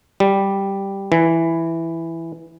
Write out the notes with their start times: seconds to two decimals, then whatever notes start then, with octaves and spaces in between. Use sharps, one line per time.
0.20 G3
1.12 E3